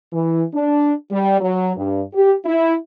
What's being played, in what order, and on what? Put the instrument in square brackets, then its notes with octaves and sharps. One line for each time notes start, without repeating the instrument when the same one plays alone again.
[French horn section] E3
D4
G3
F#3
G2
G4
E4